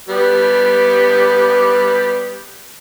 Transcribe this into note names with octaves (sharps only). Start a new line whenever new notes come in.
G3 B3 G4